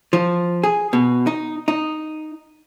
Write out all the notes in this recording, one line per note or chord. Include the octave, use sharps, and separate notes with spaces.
F3
G#4
B2
D#4
D#4